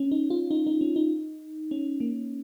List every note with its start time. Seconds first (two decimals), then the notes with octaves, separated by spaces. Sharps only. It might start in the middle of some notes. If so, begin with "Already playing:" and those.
Already playing: C#4
0.11 D#4
0.30 F4
0.51 D#4
0.67 D#4
0.81 C#4
0.96 D#4
1.71 C#4
2.00 A#3